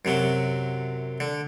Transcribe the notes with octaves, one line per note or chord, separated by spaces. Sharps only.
F#2 C3 F#3
D3